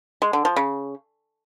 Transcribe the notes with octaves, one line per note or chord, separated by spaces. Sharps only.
G#3
D3
F3
C#3